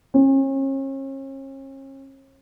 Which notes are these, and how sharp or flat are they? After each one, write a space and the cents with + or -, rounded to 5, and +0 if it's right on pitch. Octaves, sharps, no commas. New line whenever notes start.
C#4 -40